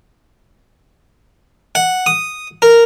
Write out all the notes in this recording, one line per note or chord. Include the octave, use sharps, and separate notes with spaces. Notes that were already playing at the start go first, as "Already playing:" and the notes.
F#5
D#6
A#4